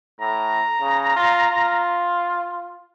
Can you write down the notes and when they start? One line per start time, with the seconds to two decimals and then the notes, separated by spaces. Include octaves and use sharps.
0.21 A2 A#5
0.80 C#3
1.16 F4
1.51 F4